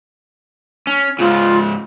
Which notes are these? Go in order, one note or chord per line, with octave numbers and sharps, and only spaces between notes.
C#4
G#2 C#3 F4